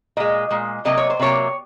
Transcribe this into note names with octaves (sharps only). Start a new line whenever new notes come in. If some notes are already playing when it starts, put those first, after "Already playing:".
A#2 G#3 D#5
A#2 G#3
C3 F#3 A#3 D#5
C#5
C5
C3 F#3 A#3 C#5